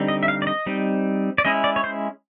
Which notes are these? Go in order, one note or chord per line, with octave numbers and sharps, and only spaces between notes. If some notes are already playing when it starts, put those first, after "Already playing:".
Already playing: D3 G3 C4 D#4
D#5
E5
F5
D5
D#5
G3 C4 D#4
D5
G#3 C#4 E4 D#5
D5
C#5
C5